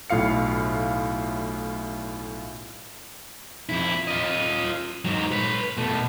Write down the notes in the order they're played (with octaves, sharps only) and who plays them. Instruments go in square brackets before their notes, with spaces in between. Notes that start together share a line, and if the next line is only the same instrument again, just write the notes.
[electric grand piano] B1 A2 F4 F5 C#7
[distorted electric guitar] F2 E4
F4 D#5
G#2 F#3
B4 C#5
B2 A3